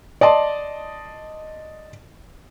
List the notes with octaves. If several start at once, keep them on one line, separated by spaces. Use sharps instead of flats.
D5 D#5 A5 C6